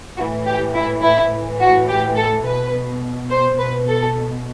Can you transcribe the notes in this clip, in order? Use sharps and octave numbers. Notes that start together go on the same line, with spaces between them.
A2 E3 F#4
G4
E4
E4
A2 E3
F#4
G4
A4
B2 B4
C5
B2 B4
A4